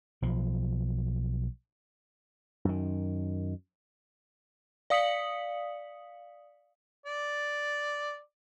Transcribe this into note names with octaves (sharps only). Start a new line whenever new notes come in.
B1 F3
F#2 D#3
D5 F5 D#6 B6 C#7 F#7
D5